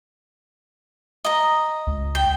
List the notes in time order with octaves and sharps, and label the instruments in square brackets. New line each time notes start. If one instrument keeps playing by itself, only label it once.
[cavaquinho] D#5 A#5
[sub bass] C#2
[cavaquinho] G5